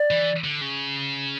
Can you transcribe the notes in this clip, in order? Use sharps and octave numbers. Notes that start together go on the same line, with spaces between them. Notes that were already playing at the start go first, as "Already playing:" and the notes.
Already playing: D5
E3
D3
C#3